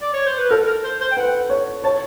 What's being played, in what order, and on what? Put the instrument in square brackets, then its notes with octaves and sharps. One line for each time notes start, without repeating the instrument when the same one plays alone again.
[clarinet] D5
C#5
C5
B4
[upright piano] A4 [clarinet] A#4
[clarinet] A#4
C5
C5
G5
[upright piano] B4 [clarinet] F#5
[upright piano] C#5
[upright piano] C#5 [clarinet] A5